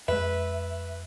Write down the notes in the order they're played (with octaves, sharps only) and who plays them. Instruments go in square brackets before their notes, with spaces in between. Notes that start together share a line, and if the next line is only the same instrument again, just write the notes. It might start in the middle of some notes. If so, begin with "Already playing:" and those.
[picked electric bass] F2 G#3 [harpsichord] B4 [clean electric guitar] E5